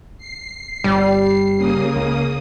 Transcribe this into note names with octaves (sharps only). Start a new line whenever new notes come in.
C7
G1 G3
C#3 A#3 D#6
C#2